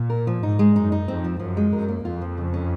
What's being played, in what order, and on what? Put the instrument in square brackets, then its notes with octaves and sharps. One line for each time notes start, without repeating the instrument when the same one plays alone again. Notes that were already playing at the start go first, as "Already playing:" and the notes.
Already playing: [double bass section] A#2
[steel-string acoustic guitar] A#4
F3
[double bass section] G#2 [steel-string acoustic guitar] D#4
[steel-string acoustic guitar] G#3
[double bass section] F#2 [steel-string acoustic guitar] D#4
[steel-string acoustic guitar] D#4
[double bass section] F2 [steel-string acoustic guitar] C4
[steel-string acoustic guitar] F3
[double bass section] F#2 [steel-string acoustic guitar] F3
[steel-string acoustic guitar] G#3
[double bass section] F#2 [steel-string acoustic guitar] A#4
[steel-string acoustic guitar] A#3
[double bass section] F2 [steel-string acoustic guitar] F4
[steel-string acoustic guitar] F3
C#3
C#4